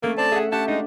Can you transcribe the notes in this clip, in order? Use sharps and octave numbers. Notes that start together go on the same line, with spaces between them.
A3 A#3 C#4
C4 D5 A5
G#4 E5 F#5
C#4 G4 E5 F#5 A5
G#3 D4 D#4